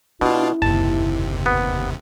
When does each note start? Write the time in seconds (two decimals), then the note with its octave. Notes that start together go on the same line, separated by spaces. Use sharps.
0.21 B2 C#4 D4 E4 F4
0.62 F#1 D#2 C3 A5
1.46 B3